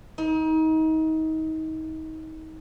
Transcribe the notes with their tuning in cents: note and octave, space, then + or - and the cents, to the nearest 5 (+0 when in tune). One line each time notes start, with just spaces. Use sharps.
D#4 +30